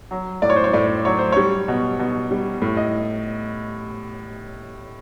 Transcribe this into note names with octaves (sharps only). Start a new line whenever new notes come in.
F#3
A2 D5
C#5
C5
C#5
A2 D5
F#3 C#5
C5
G3 C#5
B2
B2
G3
A2
D#5